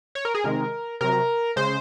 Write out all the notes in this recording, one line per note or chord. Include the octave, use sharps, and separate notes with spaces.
C#5
A#4
G#4
C3 D#3 G#3 A#4
C3 F#3 A#4
C#3 G#3 C5